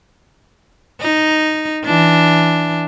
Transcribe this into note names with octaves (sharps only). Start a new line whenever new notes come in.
D#4
E3 D4